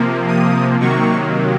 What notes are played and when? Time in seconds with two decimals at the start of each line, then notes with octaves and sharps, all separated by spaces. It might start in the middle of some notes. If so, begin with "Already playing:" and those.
Already playing: C3 F3 A#3
0.28 D#6
0.80 C3 D#3 F#3 A#3 C#6